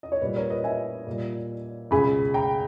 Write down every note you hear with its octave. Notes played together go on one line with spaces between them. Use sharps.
D#5
C#5
A#2 G3 B4
A#4 C#5
B4 D#5
E5 G#5
A#2 G3
C#2 B2 G#3 G#5 B5
G5 A#5